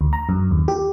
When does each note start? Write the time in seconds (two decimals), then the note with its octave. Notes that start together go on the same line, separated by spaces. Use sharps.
0.01 D2
0.13 A#5
0.29 F#2
0.51 D#2
0.68 G4